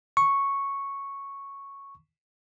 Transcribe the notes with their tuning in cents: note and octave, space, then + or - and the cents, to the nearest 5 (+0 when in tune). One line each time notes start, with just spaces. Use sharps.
C#6 -5